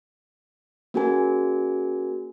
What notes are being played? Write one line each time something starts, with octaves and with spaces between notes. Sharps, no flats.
A#3 C#4 F#4 G#4 A#4 G#5